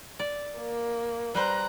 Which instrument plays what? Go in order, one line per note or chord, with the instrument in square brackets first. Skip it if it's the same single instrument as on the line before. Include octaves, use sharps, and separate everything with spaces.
[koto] D5
[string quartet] A#3
[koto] G3 B4 C5 [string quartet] A#5 F#6